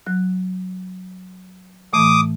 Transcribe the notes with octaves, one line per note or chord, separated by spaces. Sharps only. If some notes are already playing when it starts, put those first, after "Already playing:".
F#3 F#6
A2 E3 A3 D6 D#6